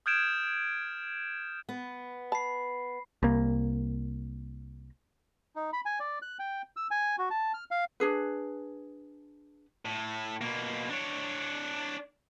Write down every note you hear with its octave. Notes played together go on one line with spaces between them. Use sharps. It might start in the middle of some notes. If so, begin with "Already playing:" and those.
D#6 F6 G6 G#6 D7 E7
B3
A5 B5 C7
C2 A#3
D#4
B5
G#5
D5
F#6
G5
E6
G#5
F#4
A5
F6
F5
D4 G#4 B4
A2
B2 A#3
D4 C#5